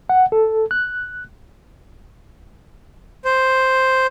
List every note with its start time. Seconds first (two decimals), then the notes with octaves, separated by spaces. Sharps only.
0.09 F#5
0.32 A4
0.71 F#6
3.25 C5